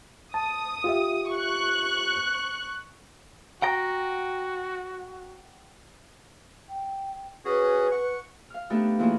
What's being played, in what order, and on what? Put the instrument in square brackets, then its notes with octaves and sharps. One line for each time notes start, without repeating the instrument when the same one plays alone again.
[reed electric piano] A5 [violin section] D#6
[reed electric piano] F4 G4 E5
[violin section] C#6 F#6
[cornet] F#4 [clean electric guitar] F#5 G5 A#5
[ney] G5
[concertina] C#4 F#4 G#4 [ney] B4
[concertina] F#5 C#6
[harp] F5 F6
A3 B3 D4 D#4 G4 A4
E3 A#3 E4 F4 G#4 C#5